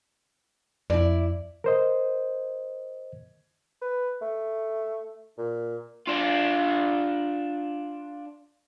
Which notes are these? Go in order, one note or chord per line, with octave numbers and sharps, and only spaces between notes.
F2 E4 D5
A#4 C5 D#5
B4
A3
A#2
D4 F4